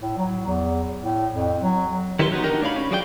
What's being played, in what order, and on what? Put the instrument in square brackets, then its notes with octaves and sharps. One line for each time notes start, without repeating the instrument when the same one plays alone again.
[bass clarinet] A2
F#3
E2
A2
F2
F#3
[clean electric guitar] D#3 E4 G4 B4 C6
B3 D#4 F#4
D4 D#4 G4 A#4
A3 D4 C#5 F5 B5
C#4
F#3 F#4 G#4 D5 F5 G5